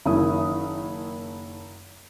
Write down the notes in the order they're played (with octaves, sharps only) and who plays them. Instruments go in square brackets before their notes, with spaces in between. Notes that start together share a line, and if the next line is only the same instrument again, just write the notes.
[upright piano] F#1 D#3 E4 D#6